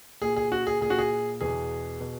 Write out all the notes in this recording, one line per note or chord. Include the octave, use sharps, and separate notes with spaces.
A#2 G#4
G#4
F#4
G#4
A#2 G#4
F#4
G#4
E2 B2 G#4
B2